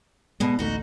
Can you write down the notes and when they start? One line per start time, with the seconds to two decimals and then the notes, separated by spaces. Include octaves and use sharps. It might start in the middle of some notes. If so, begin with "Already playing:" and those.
0.40 D2 B2 G#3
0.59 A1 D2 A3 D#4 F#4